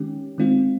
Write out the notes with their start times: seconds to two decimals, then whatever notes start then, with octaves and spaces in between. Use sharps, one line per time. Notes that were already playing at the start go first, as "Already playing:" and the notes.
Already playing: D#3 G#3 C#4 G4
0.38 D#3 G#3 C4 F4